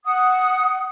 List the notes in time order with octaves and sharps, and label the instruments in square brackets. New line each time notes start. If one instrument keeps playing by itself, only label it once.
[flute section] F#5 D#6